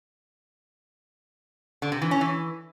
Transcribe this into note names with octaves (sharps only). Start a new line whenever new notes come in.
D3
C3
E3
C#4
E3